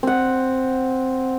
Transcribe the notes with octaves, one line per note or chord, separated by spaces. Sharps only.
C4 F#5